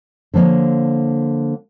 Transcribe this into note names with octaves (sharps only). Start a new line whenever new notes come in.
D3 F3 F#3 A#3 C#5